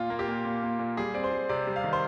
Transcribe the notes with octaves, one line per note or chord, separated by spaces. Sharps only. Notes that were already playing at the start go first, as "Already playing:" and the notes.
Already playing: A#2 F4
A#3
G4
A#2
A#2
A#3
A#2
G3 G#4
C4 D5
C5
G3
C3 D5
G3
F5
D#3
C5